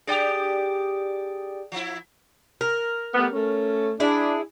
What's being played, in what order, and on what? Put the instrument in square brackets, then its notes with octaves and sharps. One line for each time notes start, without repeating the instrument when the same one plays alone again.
[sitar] D4 G4 [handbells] G#4 D5 G5
[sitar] F3 E4
[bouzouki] A#4
[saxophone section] G3 A3 B3
A3 C#4
[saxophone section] D4 [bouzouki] E4 G#4